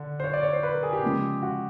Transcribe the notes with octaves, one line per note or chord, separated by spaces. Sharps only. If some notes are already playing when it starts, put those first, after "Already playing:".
Already playing: D3
C5
C#5
D5
C#5
C5
B4
A#4
G#4
G4
C#3 F3 G#3
F#4